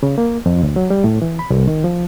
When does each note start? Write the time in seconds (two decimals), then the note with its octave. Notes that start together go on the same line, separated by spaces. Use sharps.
0.03 C#3
0.18 A#3
0.46 F2
0.63 D2
0.76 F#3
0.90 G3
1.04 A2
1.22 E3
1.39 B5
1.50 C2
1.67 D#3
1.84 F3